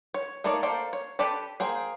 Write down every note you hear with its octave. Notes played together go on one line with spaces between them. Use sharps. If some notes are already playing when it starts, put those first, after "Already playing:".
C#5
A3 A#3 D#4 C#5 D5
A#3 A4 C5 D5
C#5
G4 A4 B4 D5 A5
A#3 G#4 C5 G5